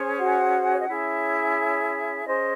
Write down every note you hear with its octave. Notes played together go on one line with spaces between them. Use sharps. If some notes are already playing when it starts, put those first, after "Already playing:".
Already playing: C#4 G#4 C5
F#4 F#5
C#5
D#5
C#4 E4 G#4 C#5 E5
C#4 G#4 C5 D#5